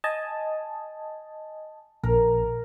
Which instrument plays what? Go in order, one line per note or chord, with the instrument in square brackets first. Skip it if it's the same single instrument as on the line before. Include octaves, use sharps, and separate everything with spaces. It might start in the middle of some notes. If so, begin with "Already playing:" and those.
[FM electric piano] D#5 G#5 A5
[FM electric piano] A#1 [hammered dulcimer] A#4